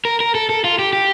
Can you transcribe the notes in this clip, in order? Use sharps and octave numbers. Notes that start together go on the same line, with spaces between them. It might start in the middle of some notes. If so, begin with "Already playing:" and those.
A#4
A#4
A4
A4
F4
G4
G4